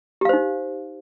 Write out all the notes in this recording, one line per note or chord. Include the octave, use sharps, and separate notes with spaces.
D#4 G4 C5 F5